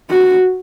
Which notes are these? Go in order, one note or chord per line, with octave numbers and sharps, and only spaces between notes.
F#4